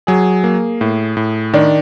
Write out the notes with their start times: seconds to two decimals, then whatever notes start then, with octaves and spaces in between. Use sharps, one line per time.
0.07 F#3 G#4
0.44 A#3
0.81 A2
1.17 A2
1.54 D#3 D4